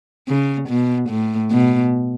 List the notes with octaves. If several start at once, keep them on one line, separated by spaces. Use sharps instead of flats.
C#3
B2
A2
B2